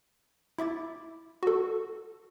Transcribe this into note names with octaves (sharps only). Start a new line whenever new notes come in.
E4 E5 D6 A6
F#4 A4